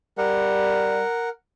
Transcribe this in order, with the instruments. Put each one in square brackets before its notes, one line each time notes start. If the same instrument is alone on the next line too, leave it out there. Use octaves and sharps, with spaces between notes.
[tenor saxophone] G3 [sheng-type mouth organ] A#4 F#5